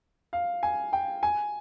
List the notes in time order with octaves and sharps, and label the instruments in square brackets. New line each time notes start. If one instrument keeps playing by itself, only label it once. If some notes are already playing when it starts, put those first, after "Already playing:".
[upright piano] F5
G#5
G5
G#5